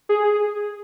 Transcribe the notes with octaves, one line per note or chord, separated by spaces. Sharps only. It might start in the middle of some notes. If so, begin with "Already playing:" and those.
G#4